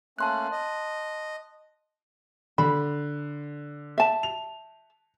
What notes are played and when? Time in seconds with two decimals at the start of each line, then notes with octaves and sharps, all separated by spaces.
0.19 A3 A#3 C#4 A5 C6 F#6
0.52 D#5
2.58 D3 B5
3.98 E5 A5
4.23 F7